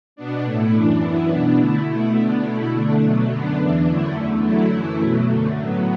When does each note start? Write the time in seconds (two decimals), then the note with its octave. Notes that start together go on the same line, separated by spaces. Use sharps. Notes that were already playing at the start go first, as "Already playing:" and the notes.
0.16 B2 B3 D4
0.44 A2 A3 E4
0.73 F#2 E3 D4
1.01 F#2 E3 B3 E4
1.29 B2 B3 D4
1.58 D3 A3 E4
1.87 B2 A3 E4
2.15 D3 B3 D4
2.44 B2 A3 E4
2.73 D3 A3 D4
3.01 B2 F#3 A3
3.29 F#2 D3 B3 D4
3.58 E2 E3 D4
3.86 F#2 D3 A3 E4
4.15 E2 D3 A3
4.43 D3 F#3 A3 E4
4.72 F#2 E3 A3 E4
5.01 B2 F#3 A3
5.29 F#2 D3 A3
5.57 A2 F#3 B3